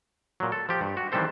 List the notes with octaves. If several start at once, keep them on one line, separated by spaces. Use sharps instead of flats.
A#2 F#3
A4
F3 G4
G2
F#4
D#3 E3 G3 C4 A4 C5